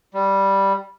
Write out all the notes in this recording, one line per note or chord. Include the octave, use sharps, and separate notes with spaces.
G3